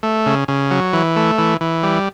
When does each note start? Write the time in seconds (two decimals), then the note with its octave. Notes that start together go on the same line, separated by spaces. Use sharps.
0.03 A3
0.26 C#3
0.48 C#3
0.71 F#3
0.93 E3
1.16 A3
1.39 E3
1.61 E3
1.83 G3